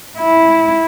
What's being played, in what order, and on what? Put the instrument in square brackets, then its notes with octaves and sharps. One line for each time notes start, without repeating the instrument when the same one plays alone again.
[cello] E4